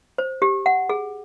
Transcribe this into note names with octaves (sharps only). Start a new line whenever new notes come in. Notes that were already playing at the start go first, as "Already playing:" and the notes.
C5
G4
F#5
G#4